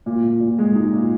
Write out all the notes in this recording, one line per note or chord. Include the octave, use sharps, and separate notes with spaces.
A#2
A#2
A#2
G#3
D#4
A#2